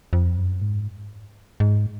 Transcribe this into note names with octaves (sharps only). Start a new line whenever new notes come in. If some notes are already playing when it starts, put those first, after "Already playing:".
F2
F#2
G#2
G#2